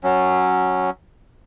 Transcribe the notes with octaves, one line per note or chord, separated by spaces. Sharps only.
F#3 C#4